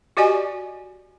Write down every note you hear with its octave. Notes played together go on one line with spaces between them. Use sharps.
F#4 G4 D5 D#5 G#5